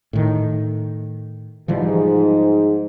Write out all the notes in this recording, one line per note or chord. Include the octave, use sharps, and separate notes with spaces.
A2 D#3
G#2 E3 F3 G3